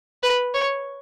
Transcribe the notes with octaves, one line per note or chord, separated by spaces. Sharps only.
B4
C#5